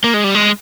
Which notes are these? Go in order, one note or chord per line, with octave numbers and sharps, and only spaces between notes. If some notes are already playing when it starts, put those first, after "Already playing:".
A#3
G#3
G3
G#3